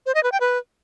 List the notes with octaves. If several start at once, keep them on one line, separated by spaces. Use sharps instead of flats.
C5
D#5
B4
G5
B4